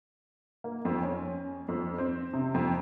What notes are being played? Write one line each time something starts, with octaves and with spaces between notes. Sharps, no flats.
A#3
F2
C#4
F2
C4
C3
F2